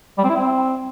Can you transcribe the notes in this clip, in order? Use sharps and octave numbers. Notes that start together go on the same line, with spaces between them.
G3
C4
E4
C4